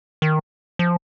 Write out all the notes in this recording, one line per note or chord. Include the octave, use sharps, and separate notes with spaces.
D#3
F3